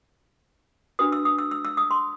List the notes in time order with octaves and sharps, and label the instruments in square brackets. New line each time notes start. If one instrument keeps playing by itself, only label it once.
[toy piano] D4 F#4 B4 D#6
E6
D#6
E6
E6
E6
D#6
C6